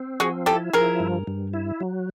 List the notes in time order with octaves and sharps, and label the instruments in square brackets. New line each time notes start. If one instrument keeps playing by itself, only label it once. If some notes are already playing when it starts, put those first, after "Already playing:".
Already playing: [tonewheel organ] C4
[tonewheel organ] F3 [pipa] F#4 G#4
[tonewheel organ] E4 [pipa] G4 A4
[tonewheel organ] F3 [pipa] G#4 A#4
[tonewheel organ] G2
G2
E4
F#3